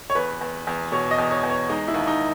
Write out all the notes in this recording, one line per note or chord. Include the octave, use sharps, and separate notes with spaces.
C#5
E2 B4
E2
E2
B2 C#5
D#5
E2
C#5
E2
C#5
G#3 D#4
E4
D#2
D#4